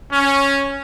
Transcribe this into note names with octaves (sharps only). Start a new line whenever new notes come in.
C#4